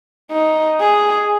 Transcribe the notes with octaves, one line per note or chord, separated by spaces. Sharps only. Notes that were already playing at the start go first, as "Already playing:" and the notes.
D#4
G#4